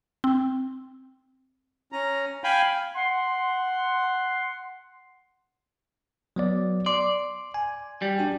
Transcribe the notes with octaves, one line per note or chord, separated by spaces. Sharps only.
C4
C#4 A#5
F5 G5 G#5 B5
F#5 C6
F#3 B3 D5
D5 C6
G#5
G3
D4 F#4 G4